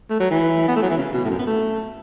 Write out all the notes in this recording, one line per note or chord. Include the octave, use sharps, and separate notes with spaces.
A3
F#3
E3
B3
A3
F#3
E3
C#3
B2
A2
F#2
B3
A3